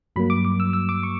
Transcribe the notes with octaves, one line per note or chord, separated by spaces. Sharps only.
G2 F#3 A#3 B5
D6
D6
E6
E6
D6
C#6